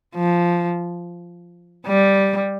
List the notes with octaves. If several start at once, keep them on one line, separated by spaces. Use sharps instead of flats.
F3
G3